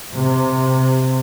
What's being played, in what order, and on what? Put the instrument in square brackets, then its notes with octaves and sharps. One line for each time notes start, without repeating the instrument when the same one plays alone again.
[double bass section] C3